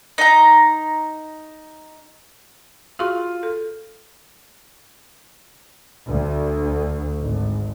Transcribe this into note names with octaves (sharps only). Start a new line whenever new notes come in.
D#4 A#5
F4 F#4 G#4 C#6
A4
D2
G#1